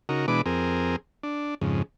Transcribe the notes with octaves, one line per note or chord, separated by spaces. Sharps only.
C#3 D#4 F#4 A#4
B2 E3 G#3 D4 B4 D6
F2 C4 G#4 A#4
D4
F2 G#2 C#3